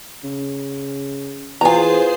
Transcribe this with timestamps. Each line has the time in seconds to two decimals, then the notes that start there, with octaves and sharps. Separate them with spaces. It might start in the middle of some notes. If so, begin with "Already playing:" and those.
0.24 C#3
1.61 E3 B3 F4 G#4 C5 G#5 A#5 C7